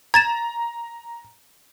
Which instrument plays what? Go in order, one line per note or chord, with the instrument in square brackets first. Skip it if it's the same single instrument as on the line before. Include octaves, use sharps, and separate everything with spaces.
[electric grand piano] A#5 [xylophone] G#6 A6 E7